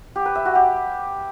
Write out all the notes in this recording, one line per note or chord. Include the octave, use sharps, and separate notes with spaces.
G4
B4
E5
F#4
G4